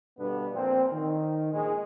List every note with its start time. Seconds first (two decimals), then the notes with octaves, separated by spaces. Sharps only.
0.18 G2 B2 D3 B3 D4
0.53 A#2 F3 C4
0.92 D#3
1.52 A#1 G#3